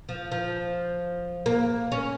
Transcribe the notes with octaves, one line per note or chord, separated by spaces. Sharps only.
F3
F3
A#3
C#4